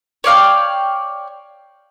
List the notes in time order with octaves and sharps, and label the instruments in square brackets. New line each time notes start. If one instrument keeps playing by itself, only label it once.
[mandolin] C#5 D5 F5 G5